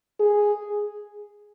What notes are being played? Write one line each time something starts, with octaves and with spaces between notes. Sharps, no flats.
G#4